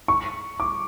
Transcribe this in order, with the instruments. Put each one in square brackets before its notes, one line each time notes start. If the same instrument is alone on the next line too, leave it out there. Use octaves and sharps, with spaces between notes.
[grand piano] C#6
D6